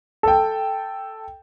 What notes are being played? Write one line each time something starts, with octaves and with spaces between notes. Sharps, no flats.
A4 G5